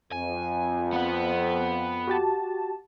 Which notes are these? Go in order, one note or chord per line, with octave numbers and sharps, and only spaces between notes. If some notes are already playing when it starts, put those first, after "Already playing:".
F2 G#5
B3 F#5
F#4 G4 A5